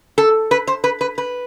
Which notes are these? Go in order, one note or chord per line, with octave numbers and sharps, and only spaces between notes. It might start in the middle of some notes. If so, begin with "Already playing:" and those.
A4
B4
C5
B4
B4
B4